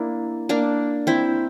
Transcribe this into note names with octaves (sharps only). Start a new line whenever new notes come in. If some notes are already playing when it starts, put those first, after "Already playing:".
Already playing: A#3 D4 E4
A#3 D4
C4 E4